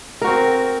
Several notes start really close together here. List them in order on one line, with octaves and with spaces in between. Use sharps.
A#4 F#4 C4